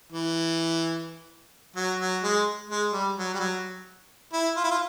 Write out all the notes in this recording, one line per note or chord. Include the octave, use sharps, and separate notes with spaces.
E3
F#3
F#3
G#3
G#3
G3
F#3
G3
F#3
E4
F4
E4
F4